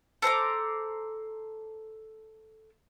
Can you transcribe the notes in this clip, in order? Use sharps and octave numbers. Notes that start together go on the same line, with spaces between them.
A4 C5 A#5 D6